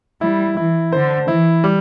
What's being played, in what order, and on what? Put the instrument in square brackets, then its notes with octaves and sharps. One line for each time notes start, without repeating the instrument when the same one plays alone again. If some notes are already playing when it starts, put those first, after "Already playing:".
[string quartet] G3 [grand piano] E4
[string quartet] E3 [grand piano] E4
[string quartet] D3 [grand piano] C5
[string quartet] E3 [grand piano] E4
[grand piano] G3